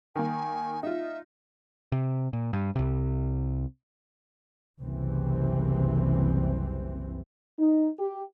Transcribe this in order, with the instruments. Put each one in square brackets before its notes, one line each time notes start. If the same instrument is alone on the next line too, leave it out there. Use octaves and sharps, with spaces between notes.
[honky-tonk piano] D#3 A#3 [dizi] G#5
[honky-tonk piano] D#4 F4 [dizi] E5
[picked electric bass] C3
A#2
G2
C2 C3
[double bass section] F#1 C2 E3 C4
[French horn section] D#4
G4